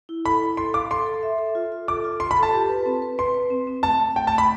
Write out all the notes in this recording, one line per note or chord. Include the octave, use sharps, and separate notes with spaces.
E4
A4 B5
E4
A4 C6
F5 D6
A4 C6
A4
E5
A4
F4
F4
A4 D6
F4
F4 C6
B5
A4
A5
G4
B4
C4
B4
B4 C6
B4
C4
C4
A3 A5
A3
A3 G5
A5
A3
B5